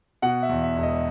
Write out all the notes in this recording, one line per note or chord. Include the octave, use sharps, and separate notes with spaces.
B2 F#5
E5
E2
E5
E1
D#5